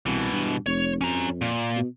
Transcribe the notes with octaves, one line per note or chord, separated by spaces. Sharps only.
C2 B2 E3
G2
F1 C#5
F2 C#4 A#5
A#2
B2